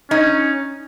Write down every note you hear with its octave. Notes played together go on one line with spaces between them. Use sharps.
C#4 D#4